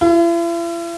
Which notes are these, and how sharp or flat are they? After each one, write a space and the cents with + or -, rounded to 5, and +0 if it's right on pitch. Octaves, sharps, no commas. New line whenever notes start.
E4 +45